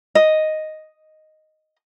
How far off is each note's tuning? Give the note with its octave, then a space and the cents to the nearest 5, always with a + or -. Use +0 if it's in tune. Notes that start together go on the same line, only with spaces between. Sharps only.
D#5 +0